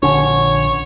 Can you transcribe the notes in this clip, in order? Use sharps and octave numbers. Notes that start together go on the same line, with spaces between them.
A#1 D3 C#4 C#5